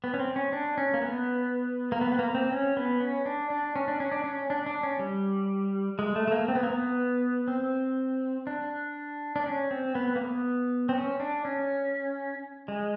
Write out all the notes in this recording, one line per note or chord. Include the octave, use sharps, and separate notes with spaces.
B3
C#4
C4
C#4
D4
C#4
A#3
B3
A#3
B3
B3
A#3
C4
C#4
B3
C#4
D4
D4
C#4
D4
C#4
D4
C#4
D4
D4
C#4
G3
G#3
A3
A3
A#3
C4
B3
A#3
B3
C4
D4
D4
C#4
C4
B3
A#3
B3
C4
C#4
D4
C#4
G#3